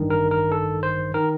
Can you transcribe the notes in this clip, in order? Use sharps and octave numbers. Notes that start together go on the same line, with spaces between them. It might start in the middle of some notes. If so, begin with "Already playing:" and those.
Already playing: A1 G2 D#3
A#4
A#4
A4
C5
D#3 A#4